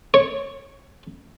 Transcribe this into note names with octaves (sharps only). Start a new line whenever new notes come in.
C#5